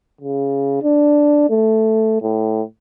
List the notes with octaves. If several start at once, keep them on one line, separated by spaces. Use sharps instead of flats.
C#3
D4
A3
A2